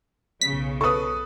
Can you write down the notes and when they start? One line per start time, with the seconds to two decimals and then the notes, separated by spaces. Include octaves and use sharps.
0.41 B1 C#3 B6
0.81 A4 B4 C#6 D#6